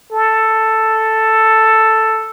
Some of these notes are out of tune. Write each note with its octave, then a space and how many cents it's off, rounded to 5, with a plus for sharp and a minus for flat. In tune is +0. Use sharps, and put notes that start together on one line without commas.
A4 +5